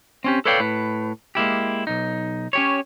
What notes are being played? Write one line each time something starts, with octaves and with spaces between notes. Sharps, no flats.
C4 C#4 G4
A4 B4 C#5 D5 F5 G5
A2 B4
G#3 A#3 E4 G4
B1 D#4
C#4 G4 C#5